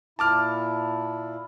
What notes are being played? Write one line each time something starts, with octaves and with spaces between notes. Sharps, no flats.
A#2 E4 A5 D6 F6